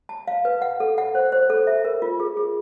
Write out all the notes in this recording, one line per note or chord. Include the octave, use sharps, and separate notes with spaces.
A5
F5
B4
F#5
A4
F#5
C5
C5
A4
E5
A#4
F4
G#4
G#4